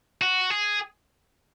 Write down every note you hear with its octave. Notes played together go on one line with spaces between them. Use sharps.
F#4
G#4